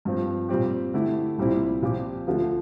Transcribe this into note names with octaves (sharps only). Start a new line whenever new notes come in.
G2 F3 C4
A#2 G3 C4 G4
D3 A3 E4 G4
C2 A#2 G3 C4 E4
A#2 F3 C4 G4
D2 D3 F3 A3